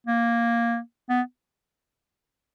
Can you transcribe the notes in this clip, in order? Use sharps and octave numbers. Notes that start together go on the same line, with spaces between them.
A#3
B3